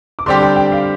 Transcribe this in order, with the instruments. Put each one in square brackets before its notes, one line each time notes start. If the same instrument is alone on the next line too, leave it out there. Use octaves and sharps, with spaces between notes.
[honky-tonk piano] D6
[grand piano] D3 G3 C4 G4 [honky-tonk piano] C6
[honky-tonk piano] G5
G5
F5